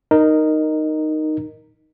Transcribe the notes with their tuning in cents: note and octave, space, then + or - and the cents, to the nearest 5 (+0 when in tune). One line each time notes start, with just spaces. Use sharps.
D#4 -10 A#4 +0